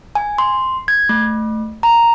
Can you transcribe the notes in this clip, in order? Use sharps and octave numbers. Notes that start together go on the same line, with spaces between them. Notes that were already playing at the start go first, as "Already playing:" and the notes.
G#5
C6
G#6
A3
A#5